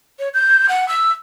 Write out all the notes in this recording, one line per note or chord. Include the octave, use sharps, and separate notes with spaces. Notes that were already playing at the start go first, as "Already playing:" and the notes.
C#5
G6
F#5
E6